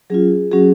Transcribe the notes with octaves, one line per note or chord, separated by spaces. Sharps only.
F#3 C#4 F4 G#4
F#3 C#4 F#4 G#4